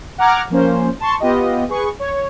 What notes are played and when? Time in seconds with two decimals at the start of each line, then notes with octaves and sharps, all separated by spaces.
0.18 F#5 A#5 D6 F6 G#6
0.50 F3 A#3 C#4 C5
1.00 A5 C6 C#6
1.20 B3 F4 G4 D#5
1.69 G#4 B4 C#6
1.99 C#5